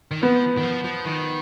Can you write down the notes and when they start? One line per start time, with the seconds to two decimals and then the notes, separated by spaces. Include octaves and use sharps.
0.11 D#3
0.22 F3 B3
0.57 D#3
0.63 F3
0.84 F3
1.05 D#3